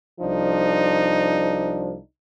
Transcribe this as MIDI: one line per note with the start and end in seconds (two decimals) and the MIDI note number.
0.20 1.95 36
0.20 1.95 53
0.20 1.95 62
0.20 2.05 63